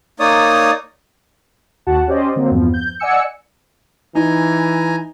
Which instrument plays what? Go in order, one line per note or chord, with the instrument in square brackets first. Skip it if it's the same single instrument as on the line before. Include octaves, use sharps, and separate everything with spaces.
[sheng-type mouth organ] A#3 D#4 C#5 D5 D#6
[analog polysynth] D#2 F#4 F#5 A5
C#4 G4 C5 D5 D#5
D3 F#3 A#3 C4
E2 G2 F3 B3
G6
D5 D#5 F#5 G#5 E6 C#7
[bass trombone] E3 [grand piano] D#4 [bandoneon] G#5 A#5